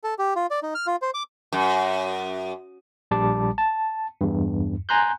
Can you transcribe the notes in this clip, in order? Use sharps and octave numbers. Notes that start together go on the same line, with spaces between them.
A4
G4
F4
D5
D#4
F6
F4
C5
D6
F#2
A#1 G3 A5 D6
A5
E2 G2
G#5 A#5 C6 F#6 G6